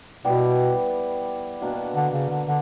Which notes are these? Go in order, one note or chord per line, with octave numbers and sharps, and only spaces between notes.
B2 G3 B3 E4 G4
B2 A#3 D4 F#4
D3
C#3
D3
D3